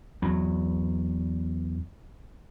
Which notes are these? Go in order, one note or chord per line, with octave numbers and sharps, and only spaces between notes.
E2 F#3